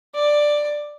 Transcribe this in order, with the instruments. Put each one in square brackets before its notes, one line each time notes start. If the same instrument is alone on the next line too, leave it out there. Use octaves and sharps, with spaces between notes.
[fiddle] D5